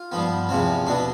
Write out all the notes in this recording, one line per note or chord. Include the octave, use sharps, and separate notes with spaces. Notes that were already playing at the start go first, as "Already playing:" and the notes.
Already playing: F4
G2 F3 B3
E2 C3 F3 C4
B2 B3 D4